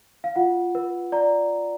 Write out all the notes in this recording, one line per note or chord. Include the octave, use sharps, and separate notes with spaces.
F5
F4 F#5
B4
D5 A#5